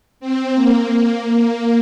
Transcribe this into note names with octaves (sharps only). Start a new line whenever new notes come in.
C4
A#3
A#3